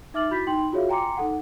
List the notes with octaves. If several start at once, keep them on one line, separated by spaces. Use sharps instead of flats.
D#4 E5 D6 F6 A6 F#7
E4 F#4 B5 G6 A6 B6
D#4 G5 C6 F#7
F4 F#4 G#4 C#5 E5 F5
G5 G#5 A#5 C6 D6 C#7
D#4 A4 F#5